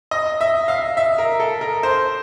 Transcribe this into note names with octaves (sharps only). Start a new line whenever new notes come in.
D#5
E5
F5
E5
A#4
A4
A#4
C5